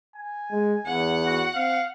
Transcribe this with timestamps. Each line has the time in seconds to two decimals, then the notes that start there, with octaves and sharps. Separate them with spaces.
0.16 G#5
0.51 G#3
0.86 E2 F#5
1.26 F#4
1.55 C4 F5